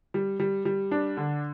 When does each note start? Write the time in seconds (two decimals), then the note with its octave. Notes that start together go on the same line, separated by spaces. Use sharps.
0.14 G3
0.40 G3
0.65 G3
0.91 D4
1.17 D3